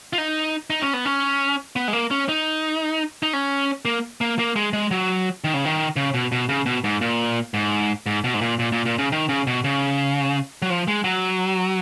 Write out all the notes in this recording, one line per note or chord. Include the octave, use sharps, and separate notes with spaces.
F4
D#4
D#4
C#4
B3
C#4
B3
G#3
A#3
C#4
D#4
D#4
C#4
A#3
A#3
A#3
G#3
G#3
F#3
D#3
C#3
D#3
C#3
B2
B2
C#3
B2
G#2
A#2
G#2
G#2
B2
G#2
A#2
A#2
A#2
A#2
C#3
D#3
C#3
B2
C#3
F#3
F3
G#3
F#3